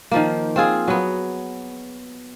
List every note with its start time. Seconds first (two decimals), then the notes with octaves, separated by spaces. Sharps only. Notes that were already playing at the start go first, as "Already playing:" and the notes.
0.11 D#3 F3 A#3
0.56 C4 F4 G#4
0.88 F#3 B3